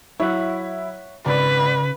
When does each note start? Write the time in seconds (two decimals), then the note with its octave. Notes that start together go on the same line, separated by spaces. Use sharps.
0.20 F#3 E4 C#5 E5 F#5
1.26 G#1 C#3 B4 D5 B5